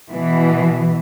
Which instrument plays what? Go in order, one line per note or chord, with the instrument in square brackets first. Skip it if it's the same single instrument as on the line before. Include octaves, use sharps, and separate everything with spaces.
[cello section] B2 E3